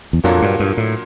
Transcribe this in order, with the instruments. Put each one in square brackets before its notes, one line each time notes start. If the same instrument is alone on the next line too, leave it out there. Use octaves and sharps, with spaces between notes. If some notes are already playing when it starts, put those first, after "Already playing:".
[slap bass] E2
[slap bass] F2 [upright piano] A#2 F#3 A#3 D4 F#4
[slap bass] G2
G2
A2